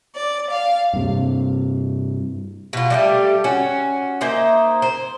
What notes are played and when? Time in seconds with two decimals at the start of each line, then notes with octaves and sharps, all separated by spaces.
0.15 D5
0.50 F5
0.94 G2 C3
2.73 B2 F4
2.90 G3 A3 G4
3.44 C#4 F#4
4.21 A#3 D#4 C5 E5
4.82 C5